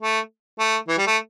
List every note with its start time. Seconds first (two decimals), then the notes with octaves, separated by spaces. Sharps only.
0.02 A3
0.59 A3
0.88 E3
0.98 G3
1.07 A3